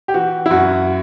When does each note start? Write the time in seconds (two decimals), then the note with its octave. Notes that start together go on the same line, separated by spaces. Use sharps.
0.08 G4
0.14 E3 F#4
0.46 E4
0.51 F#2 F#4